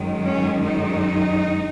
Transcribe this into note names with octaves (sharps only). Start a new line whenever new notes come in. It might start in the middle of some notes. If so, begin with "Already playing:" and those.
Already playing: F#2 D#3 G#3
C#4
D#4